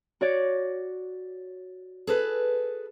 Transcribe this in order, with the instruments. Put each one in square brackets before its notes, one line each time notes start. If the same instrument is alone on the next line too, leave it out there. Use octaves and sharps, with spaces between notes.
[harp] F#4 C#5 D5
[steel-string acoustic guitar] G#4 A4 B4